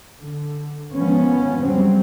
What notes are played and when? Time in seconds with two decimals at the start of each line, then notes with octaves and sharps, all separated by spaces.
0.21 D3
0.93 D#3 F3 G#3 B3 C#4
1.59 F2 C#3 F#3 G3 C4